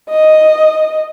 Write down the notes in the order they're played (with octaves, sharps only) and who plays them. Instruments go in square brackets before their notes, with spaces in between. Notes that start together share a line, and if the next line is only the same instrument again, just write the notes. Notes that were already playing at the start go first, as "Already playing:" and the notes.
[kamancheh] D#5